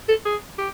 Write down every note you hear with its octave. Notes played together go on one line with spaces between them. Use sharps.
A4
G#4
G4